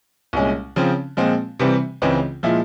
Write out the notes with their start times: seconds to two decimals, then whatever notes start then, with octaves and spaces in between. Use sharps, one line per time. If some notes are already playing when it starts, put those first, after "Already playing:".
0.33 C2 A#2 G#3 C#4
0.76 C#3 F3 C4
1.17 A#2 F3 G#3 C4
1.59 C3 E3 G3 C4
2.02 C#2 C#3 E3 G#3 C4
2.43 A#2 F3 G#3 E4